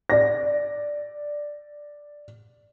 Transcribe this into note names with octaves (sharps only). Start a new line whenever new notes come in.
D5 A#6